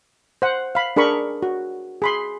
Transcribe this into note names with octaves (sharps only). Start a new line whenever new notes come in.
C5 F#5
F5 B5
D4 G#4 A#4 B5 C#6
F#4
G#4 B5 C6